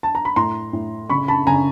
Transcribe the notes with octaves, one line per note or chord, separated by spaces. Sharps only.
A5
A#5
B5
A2 A#5 C6
A2
C#3 B5 C#6
A5 B5
C#3 G#5 A#5